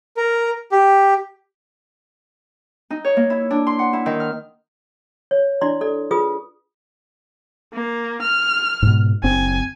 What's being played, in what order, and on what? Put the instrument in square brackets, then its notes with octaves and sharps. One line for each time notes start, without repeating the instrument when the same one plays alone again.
[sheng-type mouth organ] A#4
G4
[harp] D#4
C#5
A#3
E4
D4
C6
F#5
E4
D#3
F6
[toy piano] C#5
D4 E4 D5 C6
A4 D5
F4 G#4 B4 D#6
[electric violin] A#3
F6
[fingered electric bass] G#2 B2
[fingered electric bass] F#1 C4 [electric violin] G#5